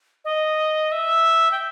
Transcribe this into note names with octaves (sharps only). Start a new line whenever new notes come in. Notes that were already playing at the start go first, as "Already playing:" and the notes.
D#5
E5
G5